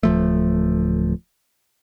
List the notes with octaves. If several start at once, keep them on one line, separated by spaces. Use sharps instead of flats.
D1 F3 A3